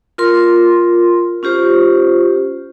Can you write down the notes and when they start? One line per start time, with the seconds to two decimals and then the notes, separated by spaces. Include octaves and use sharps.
0.18 F4 A#4 C6
1.43 C#4 F4 G4 C5